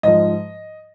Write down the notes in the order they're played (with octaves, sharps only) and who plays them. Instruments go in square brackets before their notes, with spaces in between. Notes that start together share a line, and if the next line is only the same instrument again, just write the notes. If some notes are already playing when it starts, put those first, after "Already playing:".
[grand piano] G#2 F3 D#5